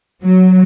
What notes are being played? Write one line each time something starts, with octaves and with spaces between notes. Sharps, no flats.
F#3